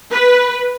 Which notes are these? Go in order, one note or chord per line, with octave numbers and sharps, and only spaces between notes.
B4